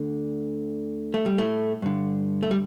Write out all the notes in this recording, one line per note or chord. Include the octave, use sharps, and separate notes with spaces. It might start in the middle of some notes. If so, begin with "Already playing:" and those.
Already playing: D2 D3
A3
G3
A2 A3
G2 D3
A3
G3